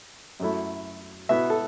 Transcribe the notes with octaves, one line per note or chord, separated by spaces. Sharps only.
F#2 F#3 A3 E4
B2 B3 E4 E5
A4